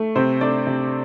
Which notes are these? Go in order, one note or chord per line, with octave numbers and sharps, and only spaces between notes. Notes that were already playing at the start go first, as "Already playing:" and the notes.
Already playing: A3
C3 C4 C5
A3 D4 D5
C3